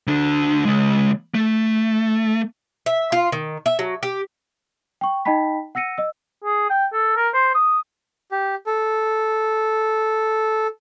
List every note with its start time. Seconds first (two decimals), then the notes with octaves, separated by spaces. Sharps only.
0.07 D2 D4
0.65 C#3 G#3
1.35 A3
2.86 E5
3.12 F4
3.32 D#3
3.66 E5
3.79 F#3
4.03 G4
5.01 G5 C#6
5.25 D#4 D#5 G5 A5 B5 B6
5.75 F#5 E6 A#6 C#7 D#7
5.98 D#5 E6
6.44 G#4
6.70 G5
6.93 A4
7.16 A#4
7.34 C5
7.55 D#6
8.32 G4
8.67 A4